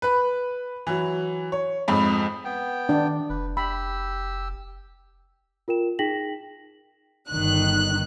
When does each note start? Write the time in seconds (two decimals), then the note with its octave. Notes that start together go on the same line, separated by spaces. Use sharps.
0.02 B4 B5
0.87 E3 F#3
1.52 C#5
1.88 F2 G#2 B5
2.45 B3 G5
2.89 D#3 D4 D5
3.30 F1 B4
3.57 G4 B5 E6
5.68 F4 A#4 G5 E7
5.99 D#4 G#4 G5 A#6 B6 F#7
7.30 G1 D#3 F#6